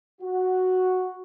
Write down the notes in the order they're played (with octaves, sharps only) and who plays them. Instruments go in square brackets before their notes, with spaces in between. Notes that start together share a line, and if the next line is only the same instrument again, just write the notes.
[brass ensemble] F#4